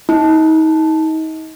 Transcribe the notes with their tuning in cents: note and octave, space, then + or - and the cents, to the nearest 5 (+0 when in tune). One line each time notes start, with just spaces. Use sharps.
D#4 +35